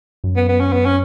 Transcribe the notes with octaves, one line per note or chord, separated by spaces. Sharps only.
F#2
B3
B3
C#4
B3
C#4